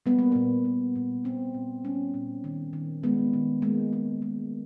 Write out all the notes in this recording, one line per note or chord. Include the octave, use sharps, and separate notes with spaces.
G3 B3
A#3
A#2 B3
A#3
A#2
A#3 C4
A#2
G3 C#4
A#2
D#3
D#3
G#3 B3
D#3
G#3 A#3
G#3
G#3